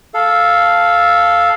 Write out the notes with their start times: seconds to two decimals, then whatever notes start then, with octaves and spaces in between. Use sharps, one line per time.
0.14 A4 F5